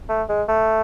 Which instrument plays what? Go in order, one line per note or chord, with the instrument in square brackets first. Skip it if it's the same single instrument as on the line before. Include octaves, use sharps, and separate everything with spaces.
[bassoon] A3
G#3
A3